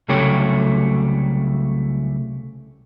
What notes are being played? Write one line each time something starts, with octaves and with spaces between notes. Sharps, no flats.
C2 C#3 F#3 A3 G4 C#5